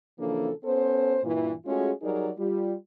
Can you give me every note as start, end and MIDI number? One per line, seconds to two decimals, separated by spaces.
0.18 0.50 49
0.18 0.50 52
0.18 0.50 53
0.18 0.50 58
0.18 0.50 62
0.18 0.50 69
0.64 1.19 59
0.64 1.19 61
0.64 1.19 69
0.64 1.19 72
1.23 1.52 43
1.23 1.52 46
1.23 1.52 52
1.65 1.90 56
1.65 1.90 57
1.65 1.90 61
1.65 1.90 65
1.65 1.90 66
1.65 1.90 68
2.02 2.29 54
2.02 2.29 55
2.02 2.29 63
2.02 2.29 68
2.02 2.29 70
2.02 2.29 74
2.37 2.73 55
2.37 2.73 65